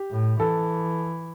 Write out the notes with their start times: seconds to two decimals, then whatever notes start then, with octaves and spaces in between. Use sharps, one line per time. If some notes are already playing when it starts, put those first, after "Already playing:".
Already playing: G4
0.11 A2
0.40 E3 A4